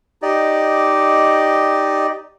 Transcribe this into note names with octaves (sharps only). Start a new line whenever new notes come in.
D#4 G4 D5 D#5